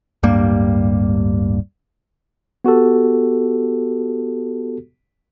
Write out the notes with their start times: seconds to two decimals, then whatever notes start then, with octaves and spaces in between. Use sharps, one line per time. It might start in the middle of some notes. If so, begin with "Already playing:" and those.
0.23 D1 G2 G3 A#3
2.65 B3 F#4 G4 A4